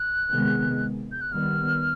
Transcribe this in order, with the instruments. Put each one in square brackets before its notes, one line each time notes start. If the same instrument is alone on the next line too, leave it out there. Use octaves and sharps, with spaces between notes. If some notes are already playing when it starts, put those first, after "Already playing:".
Already playing: [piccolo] F#6
[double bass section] C3 D#3 G#3 B3
[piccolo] G6
F#6
[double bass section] D#3 G3 B3 [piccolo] F6